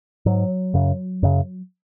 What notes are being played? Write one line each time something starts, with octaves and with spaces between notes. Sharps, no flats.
G#2 F#3
F#2 C#3
F#2 C#3